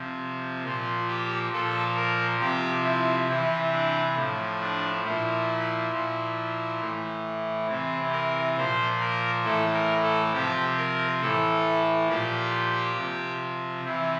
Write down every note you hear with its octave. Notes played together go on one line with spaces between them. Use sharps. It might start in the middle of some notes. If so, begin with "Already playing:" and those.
Already playing: C3 F3
A#2 F3 F4
G4
A#2 F3 A4
A#4
C3 F3 G4
E4
C3 E3 E4
D4
A2 F3
D4
A#2 F3 E4
A#2 F3
A2 E3
C3 E3 C4
A#4
A#2 F3 C5
A#4
A2 E3 A4
A#4
A4
C3 F3 G4
A#4
A2 E3 A4
A#2 F3 G4
C3 F3
C3 E3 E4